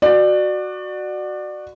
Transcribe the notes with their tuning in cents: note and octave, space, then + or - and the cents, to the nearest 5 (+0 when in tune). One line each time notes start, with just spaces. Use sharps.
F#4 +0 D5 +25